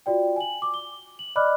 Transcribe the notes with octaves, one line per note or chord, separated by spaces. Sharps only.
F4 F#4 D5 G5
G#5 F#7
D6
G7
F#7
D5 D#5 B5 D6 F6 F#6